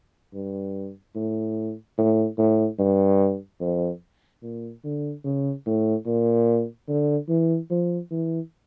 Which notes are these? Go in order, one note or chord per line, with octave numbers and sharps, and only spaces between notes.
G2
A2
A2
A2
G2
F2
A#2
D3
C#3
A2
A#2
D3
E3
F3
E3